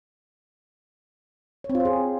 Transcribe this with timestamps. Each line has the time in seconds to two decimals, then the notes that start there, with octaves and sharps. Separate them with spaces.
1.64 C#5
1.70 C4
1.75 F4
1.80 C5
1.85 G#4